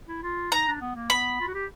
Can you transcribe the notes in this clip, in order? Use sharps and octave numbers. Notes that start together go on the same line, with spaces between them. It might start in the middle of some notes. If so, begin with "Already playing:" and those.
E4
F4
D#4 A#5
D4
B3
A#3
B3 B5
F4
F#4
G4